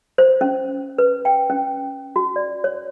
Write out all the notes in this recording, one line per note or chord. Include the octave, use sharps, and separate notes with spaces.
C5
C#4
B4
G5
C#4
F#4
D5
C#5